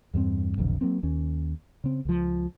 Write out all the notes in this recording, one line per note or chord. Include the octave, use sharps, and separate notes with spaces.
E2 G2 G#3 C4
F1 B1 F2 D3
F#3 G#3 A#3 C4
D#2 C#4
C#3 C4
C#2 F3